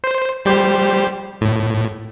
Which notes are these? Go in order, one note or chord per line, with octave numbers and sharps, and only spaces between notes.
C5
G3 G4 C5
A2